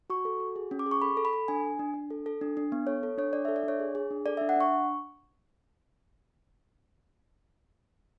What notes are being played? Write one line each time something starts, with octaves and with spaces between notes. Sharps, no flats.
F#4 C#6
A4
F#4
G#4
C#4
D6
G#4
C#6
A4 B5
A4
B5
A4
D4 G#5
D4
D4
D4
A4
A4
D4
D4
B3
A4 C#5
A4
D4 C#5
D4 D5
E5
A4
D5
D4 C#5
G#4
G#4
D4
A4 D5
E5
D4
F#5
D4 C#6